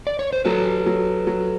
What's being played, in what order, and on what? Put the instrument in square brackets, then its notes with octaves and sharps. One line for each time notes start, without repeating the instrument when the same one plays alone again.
[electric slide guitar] D5
C#5
C5
[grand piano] F#3 [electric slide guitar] A4 B4
[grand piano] F#3
F#3